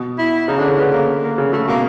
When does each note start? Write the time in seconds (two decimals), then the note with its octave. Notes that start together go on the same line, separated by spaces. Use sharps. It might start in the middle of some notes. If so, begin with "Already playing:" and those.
Already playing: B2
0.18 E4
0.48 C#3 D#4
0.58 D3 D4
0.68 C#3
0.78 D3 B3
0.92 A#3
1.22 A#3
1.38 C#3
1.52 C#3 A3
1.68 B2 A#3